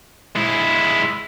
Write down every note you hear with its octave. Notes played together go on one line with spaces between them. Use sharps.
G#3 E4